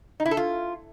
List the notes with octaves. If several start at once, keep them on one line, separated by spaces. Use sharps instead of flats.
D#4
E4
A4
F4